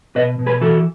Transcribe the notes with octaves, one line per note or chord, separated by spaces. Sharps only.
B2 B4 D#5
B2
G#4 B4
E3 F#4 A4